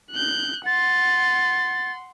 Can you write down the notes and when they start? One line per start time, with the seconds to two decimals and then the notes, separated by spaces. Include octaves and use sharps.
0.11 F#6 G6
0.66 F#5 C6 A6